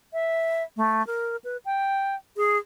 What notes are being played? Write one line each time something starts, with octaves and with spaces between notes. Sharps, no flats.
E5
A3
A#4
B4
G5
G#4